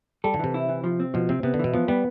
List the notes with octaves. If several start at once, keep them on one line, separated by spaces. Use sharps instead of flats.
G3 A4
D3
C3 E3
E4
E3
F3
C4
B2 F3
C3 C4
C3 B3
D3
B2 E3
F3 B3
G3 B3